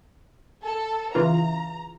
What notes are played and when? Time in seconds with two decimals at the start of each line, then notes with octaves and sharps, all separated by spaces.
0.64 A4
1.15 C#3 E3 F4 A#5